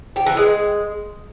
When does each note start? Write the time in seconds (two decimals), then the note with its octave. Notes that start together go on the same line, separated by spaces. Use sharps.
0.16 G4
0.26 E3
0.37 G#3